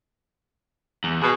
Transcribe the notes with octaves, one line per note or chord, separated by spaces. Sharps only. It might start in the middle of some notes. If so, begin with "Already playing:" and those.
E2
B2 G#4